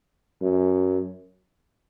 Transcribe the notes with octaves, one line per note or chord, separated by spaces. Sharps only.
F#2